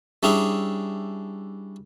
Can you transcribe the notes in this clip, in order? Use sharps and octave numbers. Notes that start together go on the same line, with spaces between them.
G3 C#4 D4 E4 G#4